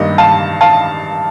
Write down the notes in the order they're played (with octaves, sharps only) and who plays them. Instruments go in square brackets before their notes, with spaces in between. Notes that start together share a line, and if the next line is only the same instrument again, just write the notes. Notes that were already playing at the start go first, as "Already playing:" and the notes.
Already playing: [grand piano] G2 D#3 G3 A#3 D4 D#5
F5 A5
F5 A5